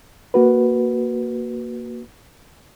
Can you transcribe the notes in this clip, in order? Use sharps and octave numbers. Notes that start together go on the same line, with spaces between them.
A#3 F#4 B4